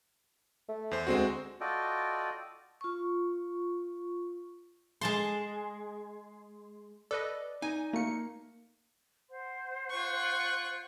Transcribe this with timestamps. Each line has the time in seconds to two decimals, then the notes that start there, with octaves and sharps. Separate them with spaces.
0.68 A3
0.91 E2 C5
1.07 D2 G#3 C4 F#4
1.61 F4 F#4 A4 D5 D#5 G5
2.81 F4 C#6
5.01 G#3 A5 C6
7.11 A4 B4 D5 D#5
7.62 D#4 G#5
7.93 A3 A#3 C#7
9.30 C5 F#5 C6
9.90 F4 C#6 F#6